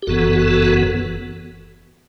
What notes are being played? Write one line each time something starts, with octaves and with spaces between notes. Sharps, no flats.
G4
F#1 F#2 E3 B3 F#4 A4